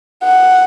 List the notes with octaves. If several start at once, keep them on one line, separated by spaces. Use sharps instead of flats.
F#5